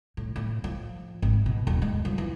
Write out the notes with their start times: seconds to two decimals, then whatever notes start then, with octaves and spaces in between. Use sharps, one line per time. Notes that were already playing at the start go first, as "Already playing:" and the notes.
0.17 A2
0.36 A2
0.64 F3
1.22 G#1
1.46 B2
1.67 D#1
1.82 G#3
2.05 F3
2.18 E3